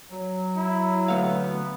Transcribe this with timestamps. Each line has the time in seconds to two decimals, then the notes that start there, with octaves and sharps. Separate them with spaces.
0.11 F#3
0.57 E4
1.08 D2 A3 B3 F5